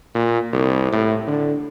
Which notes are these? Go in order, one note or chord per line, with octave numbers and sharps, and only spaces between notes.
A#2
C2
A2
D3